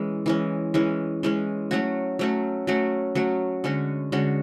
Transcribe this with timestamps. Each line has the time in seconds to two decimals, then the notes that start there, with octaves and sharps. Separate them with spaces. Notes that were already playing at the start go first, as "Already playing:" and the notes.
Already playing: E3 G#3 C#4
0.26 E3 G#3 C#4
0.74 E3 G#3 C#4
1.23 E3 G#3 C#4
1.71 F#3 A3 C#4 F#4
2.19 F#3 A3 C#4 F#4
2.67 F#3 A3 C#4 F#4
3.15 F#3 A3 C#4 F#4
3.64 D3 G#3 C#4 F#4
4.12 D3 G#3 C#4 F#4